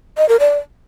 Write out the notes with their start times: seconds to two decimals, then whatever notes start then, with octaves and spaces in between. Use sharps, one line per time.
0.18 D#5
0.29 A#4
0.40 D5